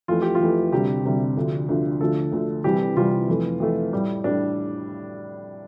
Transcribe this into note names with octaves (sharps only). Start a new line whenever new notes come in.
F2 E3 A3 F4
G4
F4
F2 E3 A3
D2 C3 G3 G4
D2 C3 G3
D2 D3 F3
D2 D3 F3
D2 D3 F3 A3 A4
D2 D3 F3 A3
C2 C3 E3 G3 G4
C2 C3 E3 G3 F4
F2 E3 A3
F2 E3 A3
A2 G3
A2 G3 D4